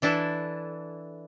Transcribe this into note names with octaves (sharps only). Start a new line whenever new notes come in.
E3 D4 E4 A4